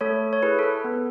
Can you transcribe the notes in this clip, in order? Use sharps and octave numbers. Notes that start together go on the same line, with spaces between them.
A3 A4 C#5
C#5
E4 G#4 B4
A4
B4
B3